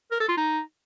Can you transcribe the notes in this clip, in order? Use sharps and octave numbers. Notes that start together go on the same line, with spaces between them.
A#4
A4
F4
D#4